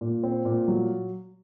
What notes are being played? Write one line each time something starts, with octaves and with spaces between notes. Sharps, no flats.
A#2
C4
A#2
F#3